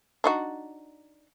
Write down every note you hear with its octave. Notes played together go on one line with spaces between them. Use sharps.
D4 D#4 F#4